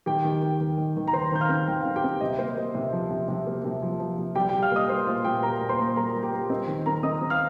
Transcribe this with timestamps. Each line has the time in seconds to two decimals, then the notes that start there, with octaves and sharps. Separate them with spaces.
0.06 D#3 G4 G5
0.24 D#3
0.42 D#3
0.60 D#3
0.78 D#3
0.97 D#3
1.08 A#5
1.13 D#3 C5 C6
1.32 D#3 G6
1.41 F5 F6
1.49 C4
1.67 D#3 G5
1.81 C4 F5
1.96 G4 G5
2.04 C4
2.21 C3 D#5
2.39 A#3 C5
2.57 A#3 D#5
2.75 C3
2.93 F3
3.10 C3
3.28 C3
3.46 A#3
3.65 C3
3.83 F3
4.00 F3
4.18 C3
4.35 G3 G4 G5
4.49 G4 G5
4.53 G3
4.62 F5 F6
4.71 A#3 D#5 D#6
4.89 A#3 C5 C6
5.07 A#2 F4 F5
5.24 A#2 G4 G5
5.42 A#3 A#4 A#5
5.60 A#2
5.69 C5 C6
5.79 A#2
5.96 G3 A#4 A#5
6.15 G3
6.23 G4 G5
6.32 A#3
6.50 C4 D#5
6.67 D#3
6.86 C4 A#4 A#5
7.03 C4 D#5 D#6
7.22 C4
7.30 F5 F6